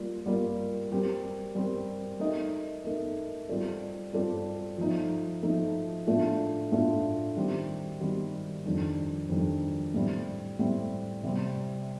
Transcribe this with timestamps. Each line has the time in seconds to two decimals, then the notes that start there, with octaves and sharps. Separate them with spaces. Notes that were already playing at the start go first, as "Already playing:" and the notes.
Already playing: G3 A#3 F4 A#4 D5
0.26 G3 A#3 F4 A#4 D5
0.90 G3 C4 G4 A#4
1.55 G3 C4 G4 A#4
2.19 A3 D#4 A#4 D#5
2.84 A3 D#4 A#4 D#5
3.49 G3 C4 F4 A4 D5
4.13 G3 C4 F4 A4 D5
4.78 F3 A3 D#4
5.43 F3 A3 D#4
6.07 A2 A3 D4 F4 A4
6.72 A2 A3 D4 F4 A4
7.36 D#3 G3 C4 G4
8.01 D#3 G3 C4 G4
8.65 F2 D#3 G3 D4
9.29 F2 D#3 G3 D4
9.94 A2 G3 C4
10.59 A2 G3 C4
11.23 C3 G3 C4